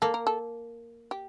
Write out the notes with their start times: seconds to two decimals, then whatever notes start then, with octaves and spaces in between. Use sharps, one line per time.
0.02 A#3 A4
0.14 A#4
0.27 A4
1.11 G4